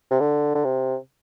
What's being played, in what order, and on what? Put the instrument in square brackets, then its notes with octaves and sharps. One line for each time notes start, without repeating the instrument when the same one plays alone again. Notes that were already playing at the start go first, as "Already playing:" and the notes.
[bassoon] C3
D3
D3
C3